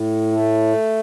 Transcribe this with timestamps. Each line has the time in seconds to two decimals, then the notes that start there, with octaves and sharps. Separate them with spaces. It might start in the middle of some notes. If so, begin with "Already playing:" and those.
Already playing: A2
0.32 A3